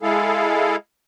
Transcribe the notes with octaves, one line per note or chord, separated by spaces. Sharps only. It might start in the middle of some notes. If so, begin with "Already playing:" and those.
G#3 E4 G#4 A4 F5